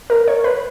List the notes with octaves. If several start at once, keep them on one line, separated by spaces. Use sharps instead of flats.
A#4
C#5
B4